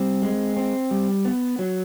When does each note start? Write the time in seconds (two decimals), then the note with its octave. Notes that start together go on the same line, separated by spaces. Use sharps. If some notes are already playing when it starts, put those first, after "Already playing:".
Already playing: G3 C4
0.22 G#3
0.57 C4
0.91 G3
1.25 B3
1.59 F#3